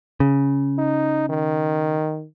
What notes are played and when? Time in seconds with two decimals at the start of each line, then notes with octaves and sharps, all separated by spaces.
0.20 C#3
0.78 D#4
1.29 D#3